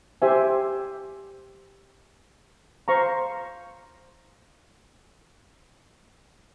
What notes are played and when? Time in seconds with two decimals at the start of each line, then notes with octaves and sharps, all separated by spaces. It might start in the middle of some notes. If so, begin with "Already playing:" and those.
0.22 G4 C5 E5 G#5
2.88 C5 F5 A#5 C#6